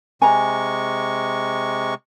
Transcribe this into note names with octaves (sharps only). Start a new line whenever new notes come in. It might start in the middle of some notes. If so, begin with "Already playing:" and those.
C3 G#3 G#5 A#5 C#6